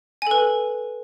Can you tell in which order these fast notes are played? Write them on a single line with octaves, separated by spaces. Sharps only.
G#5 A4 B4